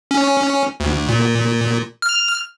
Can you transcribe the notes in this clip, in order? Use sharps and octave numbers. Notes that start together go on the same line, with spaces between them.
C#4
D2
A#2
F6